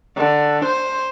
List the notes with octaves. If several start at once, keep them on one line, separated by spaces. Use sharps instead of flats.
D3
C5